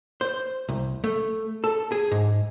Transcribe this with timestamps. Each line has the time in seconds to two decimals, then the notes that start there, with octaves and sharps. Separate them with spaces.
0.21 C5
0.68 C2
1.04 A3
1.64 A4
1.92 G#4
2.11 G#2